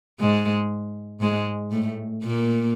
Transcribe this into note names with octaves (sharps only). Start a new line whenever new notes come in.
G#2 G#3
G#2 G#3
A2 A3
A#2 A#3